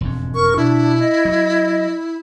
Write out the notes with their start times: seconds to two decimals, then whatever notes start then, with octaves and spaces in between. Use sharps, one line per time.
0.01 E1 F2 G#2
0.35 A#4 C#6
0.57 B2 D4 E4
0.99 D#5
1.25 F#3